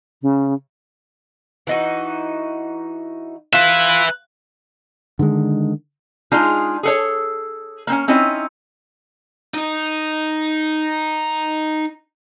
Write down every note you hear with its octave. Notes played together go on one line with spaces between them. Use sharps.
C#3
E3 D#4 F#4
F4 B4 E5 F#6
D3 D#3 G3 G#3
G#3 D4 D#4 F4 G#4
G#4 A4 C#5
A#3 C4 C#4
C4 C#4 D#4 E4
D#4 D#5